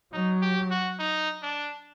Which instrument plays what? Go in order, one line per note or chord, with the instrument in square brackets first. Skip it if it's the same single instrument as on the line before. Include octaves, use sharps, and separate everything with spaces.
[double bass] F#3 [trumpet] D#4
[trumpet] G4
F#4
D#4
D4